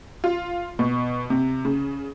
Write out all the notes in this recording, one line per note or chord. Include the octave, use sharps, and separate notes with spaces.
F4
B2
C3
C#3